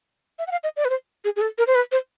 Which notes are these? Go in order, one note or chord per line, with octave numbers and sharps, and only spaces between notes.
E5
F#5
F5
D#5
D5
B4
C5
G#4
G#4
A4
A#4
C5
B4
C5